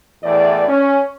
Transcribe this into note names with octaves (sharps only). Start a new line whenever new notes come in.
E2 A2 E3 D5
C#4